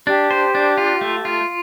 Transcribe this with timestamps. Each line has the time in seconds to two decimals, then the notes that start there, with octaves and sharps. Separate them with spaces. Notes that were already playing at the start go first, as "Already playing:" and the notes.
0.07 D4 G4
0.31 C5
0.55 D4
0.77 F4
1.01 A3
1.25 F4